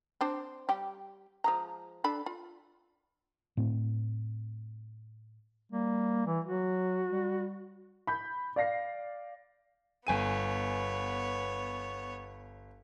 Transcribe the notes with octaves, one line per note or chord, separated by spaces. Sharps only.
C4 D4 C5
G3 G4 G5
F3 G#3 A#5
D4 A4 B5
F4
A2 C4
G3 A#3
E3
F#3 F#4
G3
B5 G6
D5 F5 A#6 C7
G1 B3 C#5 G#5 D#7